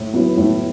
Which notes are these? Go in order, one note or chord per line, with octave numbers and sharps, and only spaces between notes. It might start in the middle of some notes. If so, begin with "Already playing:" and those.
Already playing: A2
F#3 B3 E4 B4
A2